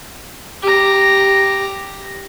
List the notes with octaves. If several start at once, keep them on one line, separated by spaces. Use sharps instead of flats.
G4 A#5